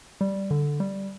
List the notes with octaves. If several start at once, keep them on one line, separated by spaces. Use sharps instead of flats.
G3
D3
G3